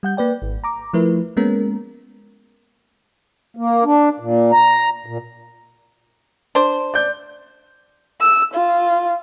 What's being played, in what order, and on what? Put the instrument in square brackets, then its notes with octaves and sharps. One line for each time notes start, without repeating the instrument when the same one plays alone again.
[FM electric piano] G3 F#5 G6
A#3 B4 D5 G5
G#1
A#5 D6
F3 A3 E4 A#4 B4
G#3 A#3 B3 C#4 A#4
[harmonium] A#3
D4
A#2
A#5
A#2
[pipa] D4 C5
[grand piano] D5 G6
[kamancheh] E6
F4